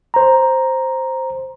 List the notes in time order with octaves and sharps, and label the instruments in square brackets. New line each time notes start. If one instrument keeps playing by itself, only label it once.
[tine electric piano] C5 A#5